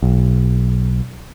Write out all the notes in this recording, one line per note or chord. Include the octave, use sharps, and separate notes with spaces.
B1